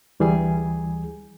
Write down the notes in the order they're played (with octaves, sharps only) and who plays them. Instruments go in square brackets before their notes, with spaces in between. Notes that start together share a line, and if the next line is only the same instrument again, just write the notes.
[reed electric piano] D2 E3 G3 G#4 G#5